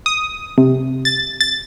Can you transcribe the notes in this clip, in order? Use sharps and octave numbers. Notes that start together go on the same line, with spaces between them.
D#6
C3
A6
A6